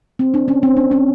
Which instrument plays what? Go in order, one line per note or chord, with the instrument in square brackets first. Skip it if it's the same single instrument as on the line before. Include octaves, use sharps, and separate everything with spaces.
[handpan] C4
D4
C#4
C4
D4
C#4